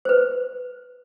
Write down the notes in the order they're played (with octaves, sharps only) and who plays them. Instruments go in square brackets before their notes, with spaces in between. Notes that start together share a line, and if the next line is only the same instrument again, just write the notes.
[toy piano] B4 C5